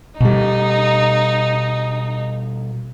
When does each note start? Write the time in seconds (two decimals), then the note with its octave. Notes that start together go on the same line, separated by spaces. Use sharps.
0.20 B2 G3 D#4